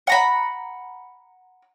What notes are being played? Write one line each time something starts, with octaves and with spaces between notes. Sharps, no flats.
F#5 A#5 B5